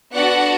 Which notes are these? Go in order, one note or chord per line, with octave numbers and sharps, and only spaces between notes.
B3 D4 F#4 A4 D5 F#5